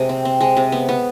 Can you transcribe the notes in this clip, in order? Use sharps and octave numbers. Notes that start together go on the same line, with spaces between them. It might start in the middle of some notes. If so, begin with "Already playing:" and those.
Already playing: C3 G#3
C4
C4
G#3
C3
B3
B3